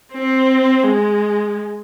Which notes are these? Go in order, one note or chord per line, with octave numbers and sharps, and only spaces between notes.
C4
G#3